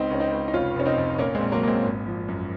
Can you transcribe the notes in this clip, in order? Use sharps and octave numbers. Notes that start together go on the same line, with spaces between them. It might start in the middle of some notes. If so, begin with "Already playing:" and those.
Already playing: C#2 C4 D#4
C#2 C#4
C4 D#4
C#2
D#4
F1 C#4 F4
F1 C#4
C4 D#4
F2
A#2 A#3 C#4
G#3 C4
A#1
F#3 A#3
A#2 G#3 A#3 C4
G#1
F3
F#2